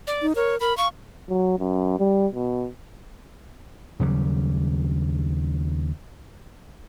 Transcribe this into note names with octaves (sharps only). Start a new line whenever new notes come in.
D5
D#4
A#4 C#5
A#4 B5
F5 C#6
F#3
F#2
G3
B2
D#2 C#3 F#3 G3